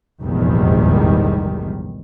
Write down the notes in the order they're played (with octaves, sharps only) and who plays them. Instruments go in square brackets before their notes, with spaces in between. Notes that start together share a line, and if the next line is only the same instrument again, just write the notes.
[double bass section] F1 A#1 E2 G#2 D#3 G3